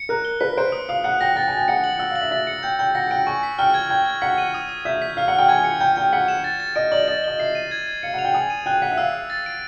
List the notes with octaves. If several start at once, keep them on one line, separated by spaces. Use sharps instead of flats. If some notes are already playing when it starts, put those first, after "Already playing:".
Already playing: C#7
A#4 F#6
G7
B4 B6
C5 D7
D#6
F5 D#6
F#5 F#6
G5 A#6
G5 A6
G#5
G5 A6
F#5 C#7
F#7
F#5 E6
F5
F#7
E5
E5 A6
C#7
G5 G6
G5 G6
F#5 A#6
G5 D7
G#5 C#6
B6
G5 F6
G#6
G5 G#6
G#6
F#5 B6
D#7
D#6
D#6
E5 G6
B6
F5 F6
F#5
G5 F6
G#5 G#6
C#7
G5 G6
G5 G6
F#5 B6
E7
A6
A6
D#5 D7
D5 F#7
D#5 A6
D#5 G7
E5 C7
D#7
G#6
G#6
F5 C#7
F#5
F7
G5
G#5 D#6
D#7
G5 F#6
F#5 B6
E5
F5 E6
E6
A6
D7